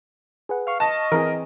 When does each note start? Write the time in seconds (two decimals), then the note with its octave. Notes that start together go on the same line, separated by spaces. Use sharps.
0.49 G#4 B4 F#5
0.67 F5 C#6 F6
0.80 D#5 A5
1.12 E3 C4 G#4 A#4